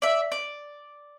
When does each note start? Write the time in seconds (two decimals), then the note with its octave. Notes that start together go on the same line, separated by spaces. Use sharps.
0.02 D5 E5
0.32 D5